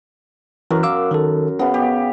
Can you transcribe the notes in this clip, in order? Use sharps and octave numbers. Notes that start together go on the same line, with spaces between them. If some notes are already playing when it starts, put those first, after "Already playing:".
F#2 E3
F5 D6 E6
D#3 A4
C#3 B3 C#4
G4